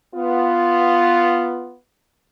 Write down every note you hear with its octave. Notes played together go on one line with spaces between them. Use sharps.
B3 F4